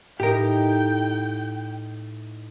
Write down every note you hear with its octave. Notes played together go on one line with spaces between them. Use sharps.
A2 D#4 G4 A#4 G5